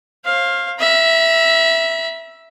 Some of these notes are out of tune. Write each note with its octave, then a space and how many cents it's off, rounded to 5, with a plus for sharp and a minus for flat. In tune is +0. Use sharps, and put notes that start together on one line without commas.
C5 +45 F5 +0
E5 +0 B5 -45